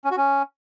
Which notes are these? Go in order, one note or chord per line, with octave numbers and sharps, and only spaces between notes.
C#4
F#4
C#4